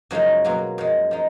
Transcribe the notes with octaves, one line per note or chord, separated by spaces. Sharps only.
F#2 C#3 F3 G#3 D#4
B2 F#3 A#3 F4
F#2 F3 G#3
F3 G#3 D#4